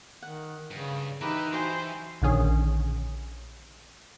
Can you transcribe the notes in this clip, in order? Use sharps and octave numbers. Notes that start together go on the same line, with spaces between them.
D#3 F#5
G2 C#3
E3 D#4 G4 A#4 B4 E5
F#4 C5 G5 G#5
A#1 D3 D#3 C#4 G#4